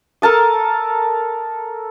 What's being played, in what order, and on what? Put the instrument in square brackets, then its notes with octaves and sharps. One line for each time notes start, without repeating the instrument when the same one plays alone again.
[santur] A4 A#4 A5 D#6